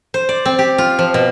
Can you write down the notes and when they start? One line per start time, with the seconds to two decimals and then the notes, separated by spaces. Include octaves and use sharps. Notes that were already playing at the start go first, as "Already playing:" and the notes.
0.14 C5
0.29 D5
0.46 C4
0.59 G4
0.78 F4
0.99 F3
1.14 B2